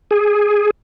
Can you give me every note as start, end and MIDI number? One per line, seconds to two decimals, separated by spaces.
0.11 0.70 68